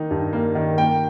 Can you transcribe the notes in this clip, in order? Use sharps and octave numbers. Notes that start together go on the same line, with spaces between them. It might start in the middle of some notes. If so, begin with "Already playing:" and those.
Already playing: D#3 A#3 D#4
G2
A#3
D#3
A#3 G5